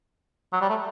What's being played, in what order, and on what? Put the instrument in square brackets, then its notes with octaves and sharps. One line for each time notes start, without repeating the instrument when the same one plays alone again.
[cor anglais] F#3
G3
A3